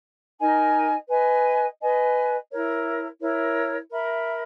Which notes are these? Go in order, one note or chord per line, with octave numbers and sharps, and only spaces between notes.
D#4 A#4 D#5 G#5
B4 D#5 G#5
B4 D#5 G#5
E4 A#4 C#5
E4 A#4 C#5
A#4 E5 B5